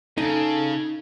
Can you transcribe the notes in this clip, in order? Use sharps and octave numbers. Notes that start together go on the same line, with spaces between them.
C#3 D#4 A4